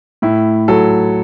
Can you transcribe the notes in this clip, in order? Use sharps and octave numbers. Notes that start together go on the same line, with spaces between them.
A2 E4
F#3 A4